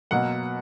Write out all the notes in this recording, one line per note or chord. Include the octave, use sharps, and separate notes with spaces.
B2 F#3 A#3 F#5